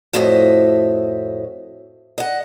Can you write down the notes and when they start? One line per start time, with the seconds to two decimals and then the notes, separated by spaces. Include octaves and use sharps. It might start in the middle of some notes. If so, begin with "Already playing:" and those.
0.13 F2 A2 F#4 C5 D#5 E5
2.18 D#5 F#5